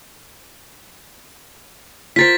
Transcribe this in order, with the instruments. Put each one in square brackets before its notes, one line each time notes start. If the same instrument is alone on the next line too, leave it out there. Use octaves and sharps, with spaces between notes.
[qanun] F4 A#4 C5 [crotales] A6 B6